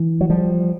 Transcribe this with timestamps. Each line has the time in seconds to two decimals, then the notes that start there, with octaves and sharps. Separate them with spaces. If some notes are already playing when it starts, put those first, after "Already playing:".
Already playing: E3
0.21 F#3
0.30 F3 G3